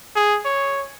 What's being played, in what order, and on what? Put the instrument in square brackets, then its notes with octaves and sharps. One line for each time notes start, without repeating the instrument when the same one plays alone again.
[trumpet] G#4
C#5